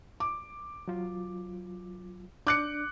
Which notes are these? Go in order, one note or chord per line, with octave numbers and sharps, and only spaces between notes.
D6
F#3 F4
D4 D6 F#6 G6 C#7